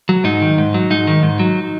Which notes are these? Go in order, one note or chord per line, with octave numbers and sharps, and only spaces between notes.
F#3
G#2 D#4
D#3
G#2
F#3
G#2 D#4
D#3
G#2
F#3